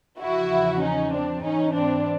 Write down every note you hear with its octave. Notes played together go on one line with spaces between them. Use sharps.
E2 C#3 F3 E4 F#4
C#4 D#4
C4 D4
G#2 E3 C#4 D#4
C4 D4